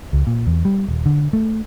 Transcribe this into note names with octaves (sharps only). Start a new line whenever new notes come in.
C#2
A#2
E2
G3
D#1
D3
A3